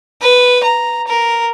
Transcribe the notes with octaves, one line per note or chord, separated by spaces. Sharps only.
B4
A#5
A#4